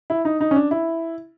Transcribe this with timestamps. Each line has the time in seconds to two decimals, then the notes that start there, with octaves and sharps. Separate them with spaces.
0.10 E4
0.25 D#4
0.41 D#4
0.51 C#4
0.56 D4
0.71 E4